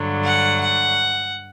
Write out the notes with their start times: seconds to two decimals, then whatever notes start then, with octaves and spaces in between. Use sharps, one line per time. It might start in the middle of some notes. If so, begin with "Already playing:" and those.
Already playing: G2 D3 F#3
0.24 F#5
0.61 F#5